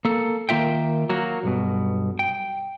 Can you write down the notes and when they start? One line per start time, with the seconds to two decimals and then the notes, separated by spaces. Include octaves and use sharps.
0.05 A#3 A4
0.49 D#3 A#3 F4 E5 G5
1.09 F#3 A#3 F#4
1.43 B1 G2 B2
2.19 G5